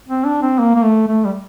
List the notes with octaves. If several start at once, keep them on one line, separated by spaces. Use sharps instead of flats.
C4
D4
C4
A#3
A#3
A3
A3
G3